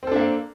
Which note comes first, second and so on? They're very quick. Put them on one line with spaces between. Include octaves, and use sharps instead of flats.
C4 A4 D4 A#3